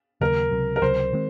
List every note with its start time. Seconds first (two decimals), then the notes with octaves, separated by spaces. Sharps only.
0.21 D#2 C#3 F#3 A#3 A#4
0.51 C#2 C3 F#3
0.76 A#4
0.82 C#2 C3 F#3 C5
1.13 D#3 G#3 C4